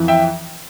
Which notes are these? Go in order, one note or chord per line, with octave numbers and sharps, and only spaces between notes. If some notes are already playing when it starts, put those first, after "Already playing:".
Already playing: F2 E3
E5 G5